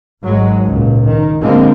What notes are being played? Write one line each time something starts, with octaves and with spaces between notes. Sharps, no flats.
G#1 F#3 G#3
C#2 A#2
D#3
B2 D3 F3 G#3 A#3 C4